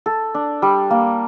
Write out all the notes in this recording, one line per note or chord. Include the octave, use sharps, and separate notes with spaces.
A4
D4
G3
A#3